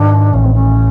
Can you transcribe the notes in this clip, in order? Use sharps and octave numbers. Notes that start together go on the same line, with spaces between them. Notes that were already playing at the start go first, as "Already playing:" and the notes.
Already playing: G#2 D#3 D4
A1 C#4
C4
C#4